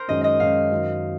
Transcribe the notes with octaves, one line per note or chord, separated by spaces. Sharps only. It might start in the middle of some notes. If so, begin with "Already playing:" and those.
Already playing: A#4 C5
F#2 D#3 G#3 C#4 D#5
D#5
F#2 D#3 G#3 C#4 F5
F#2 D#3 F#3